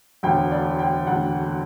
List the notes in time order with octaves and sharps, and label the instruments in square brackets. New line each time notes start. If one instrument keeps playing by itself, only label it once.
[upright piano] E1 D2 D3 G5
D5
G5
E1 D2 D3 F#5